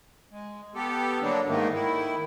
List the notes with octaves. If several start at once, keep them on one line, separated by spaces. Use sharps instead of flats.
G#3
B3 G4 A4
D3 F#3 G3 A#3 D4
G#2 D#3 A3 A#3
D#3 E4